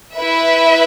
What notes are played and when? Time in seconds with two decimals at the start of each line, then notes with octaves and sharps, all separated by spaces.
0.14 E4 B4 E5